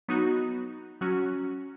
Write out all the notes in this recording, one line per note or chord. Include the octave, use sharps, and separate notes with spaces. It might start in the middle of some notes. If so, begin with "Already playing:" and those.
F#3 B3 D#4 F#4
F#3 C#4 F#4